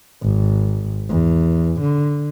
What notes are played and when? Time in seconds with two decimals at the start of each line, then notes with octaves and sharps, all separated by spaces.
0.22 G#1
1.09 E2
1.81 D3